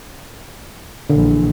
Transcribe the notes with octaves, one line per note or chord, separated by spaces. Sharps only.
A#1 D3 E3